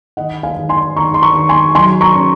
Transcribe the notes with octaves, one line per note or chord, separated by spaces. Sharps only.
D#3 D#5 F#5
F5 G#5
D#3
G#5 C6
D#3 A#5 C#6
C6
A#5 C#6
D#3
G#5 C6
F#3 G#5 C6
A#5 C#6
C#4